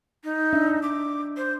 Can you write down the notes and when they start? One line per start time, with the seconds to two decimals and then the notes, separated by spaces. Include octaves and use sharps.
0.24 D#4
0.53 D4 E5
0.83 D6
1.37 C5